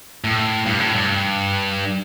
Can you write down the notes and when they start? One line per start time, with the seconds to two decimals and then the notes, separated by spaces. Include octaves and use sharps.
0.24 A2
0.66 G2
0.80 A2
0.95 G2